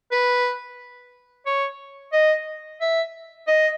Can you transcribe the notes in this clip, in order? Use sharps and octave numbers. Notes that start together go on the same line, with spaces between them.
B4
C#5
D#5
E5
D#5